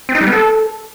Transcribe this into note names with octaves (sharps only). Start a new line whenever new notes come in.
C4
D#4
G3
B3
A4